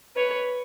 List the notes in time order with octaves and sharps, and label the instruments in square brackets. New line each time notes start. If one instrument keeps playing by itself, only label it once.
[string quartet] B4 C#5